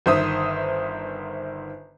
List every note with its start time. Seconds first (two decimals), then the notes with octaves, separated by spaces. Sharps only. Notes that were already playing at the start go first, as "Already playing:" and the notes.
0.06 G1 D#3 C5 E5 D#6